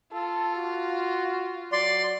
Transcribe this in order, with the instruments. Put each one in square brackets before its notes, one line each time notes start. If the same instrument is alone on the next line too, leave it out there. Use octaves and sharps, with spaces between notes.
[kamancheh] F4 [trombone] A4
[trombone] F#4
[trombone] F#3 [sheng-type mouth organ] D5 C6